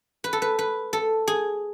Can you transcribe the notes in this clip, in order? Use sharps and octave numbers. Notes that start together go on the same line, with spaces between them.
B4
A4
B4
B4
A4
G#4